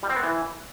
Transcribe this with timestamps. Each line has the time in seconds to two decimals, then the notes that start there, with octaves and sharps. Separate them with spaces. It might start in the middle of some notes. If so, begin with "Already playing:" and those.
0.03 G3
0.10 C4
0.16 B3
0.23 E3